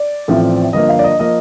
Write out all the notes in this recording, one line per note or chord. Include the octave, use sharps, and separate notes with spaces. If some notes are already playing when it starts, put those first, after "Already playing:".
Already playing: D5
A1 A2 F3 C4
G1 G2 F3 A#3 D#5
F5
D5
D#5
F3 A#3 D#5